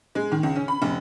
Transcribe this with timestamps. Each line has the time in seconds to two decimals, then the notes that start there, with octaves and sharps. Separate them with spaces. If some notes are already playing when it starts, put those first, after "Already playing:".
0.15 G#3
0.32 D#3
0.43 C#2
0.55 C#4
0.68 B5
0.82 F1